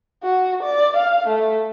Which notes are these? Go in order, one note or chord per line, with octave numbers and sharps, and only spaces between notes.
F#4
D5
F5
A3